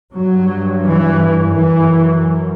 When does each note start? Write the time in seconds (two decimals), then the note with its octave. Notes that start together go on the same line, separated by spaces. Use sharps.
0.13 G2 F#3
0.83 E3
1.52 F#2 E3